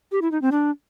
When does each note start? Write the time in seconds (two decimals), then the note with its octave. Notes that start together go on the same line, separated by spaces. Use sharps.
0.12 G4
0.22 E4
0.32 D#4
0.42 C4
0.52 D4